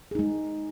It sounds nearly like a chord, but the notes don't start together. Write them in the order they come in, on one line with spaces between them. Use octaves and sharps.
G#4 D#4 G#3